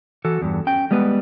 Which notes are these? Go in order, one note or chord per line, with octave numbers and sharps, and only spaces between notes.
E3 F#4 A4
E2 G2
C#4 G5
G3 G#3 B3 B4